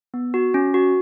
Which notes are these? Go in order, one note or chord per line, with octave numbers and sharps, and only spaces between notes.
B3
F#4
C#4
F#4